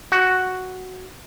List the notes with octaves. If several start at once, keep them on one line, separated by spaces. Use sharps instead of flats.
F#4